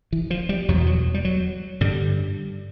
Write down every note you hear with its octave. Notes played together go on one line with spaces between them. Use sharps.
E3
F3
G3
E2 B2 F#3
F#3
G3
F#3
G2 D3 G3